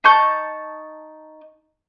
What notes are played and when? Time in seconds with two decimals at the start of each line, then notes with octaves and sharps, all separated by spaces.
0.04 D#4 A5 C#6 G6